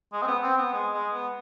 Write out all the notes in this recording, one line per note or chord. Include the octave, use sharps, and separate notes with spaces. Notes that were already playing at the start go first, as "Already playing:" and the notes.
G#3
C4
B3
C4
B3
G#3
G#3
B3